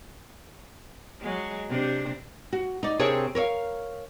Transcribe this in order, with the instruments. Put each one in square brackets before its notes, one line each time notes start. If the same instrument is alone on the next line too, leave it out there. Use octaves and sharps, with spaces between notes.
[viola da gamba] F#3 G#3
C3 D4
[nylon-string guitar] F#4
D#4 D5
C3 C4 D4 G#4 A#4 C#5
A#4 C#5 E5 F5